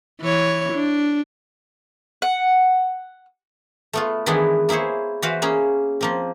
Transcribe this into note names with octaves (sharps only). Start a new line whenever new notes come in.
E3 C#5
D4
F#5
A3 B3 F4
D#3 E3 G#3 B3 D4 E4
A#3 E4 G#4 C5 C#5
E3 F#4 B4 C5 F5
A#3 C#4 G#4
F3 A#3 C4